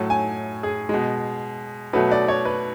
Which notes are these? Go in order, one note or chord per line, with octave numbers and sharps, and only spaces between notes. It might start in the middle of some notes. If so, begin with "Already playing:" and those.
Already playing: A2 F#3 A3 A5
G#5
G#4
B2 G#3
B2 F#3 A3 B4
D5
C#5
B4